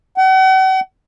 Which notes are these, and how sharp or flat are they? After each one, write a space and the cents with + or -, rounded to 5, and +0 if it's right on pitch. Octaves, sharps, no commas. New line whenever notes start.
F#5 +40